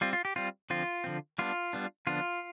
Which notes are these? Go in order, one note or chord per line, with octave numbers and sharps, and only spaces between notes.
G3 C4 F4
F4
G4
G3 C4 F4
D3 F3 C4 F4
D3 F3 C4
G3 B3 D4 F4
G3 B3 D4
D3 F3 B3 D4 F4